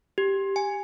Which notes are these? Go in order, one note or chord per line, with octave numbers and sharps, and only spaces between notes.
G4
G#5